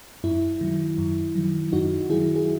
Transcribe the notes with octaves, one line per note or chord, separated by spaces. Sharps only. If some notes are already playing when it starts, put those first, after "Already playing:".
F#2 E4
D#3 F#3
F#2
D#3 F#3
F#2 D#4 F#4
D#3 F#3 E4 G#4
G#4